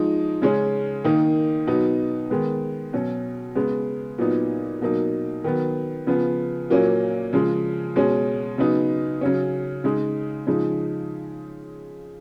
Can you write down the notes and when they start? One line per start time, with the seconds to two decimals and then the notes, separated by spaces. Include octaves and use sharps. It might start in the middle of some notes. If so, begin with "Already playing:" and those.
Already playing: F3 G#3 D#4
0.42 C#3 G#3 C#4
1.04 D#3 A#3 D#4
1.67 B2 F#3 B3 D#4
2.30 D#3 G#3 B3
2.93 B2 F#3 C#4
3.55 C#3 G#3 B3
4.18 A#2 F#3 B3 D#4
4.81 B2 F#3 A#3 D#4
5.44 D#3 F#3 B3
6.07 C#3 F3 B3
6.70 A#2 F#3 A#3 C#4
7.33 C#3 F3 G#3
7.96 B2 G#3 C#4
8.58 C#3 F#3 B3 D#4
9.21 C#3 F#3 C#4
9.84 C#3 G#3 D#4
10.47 C#3 F3 G#3 D#4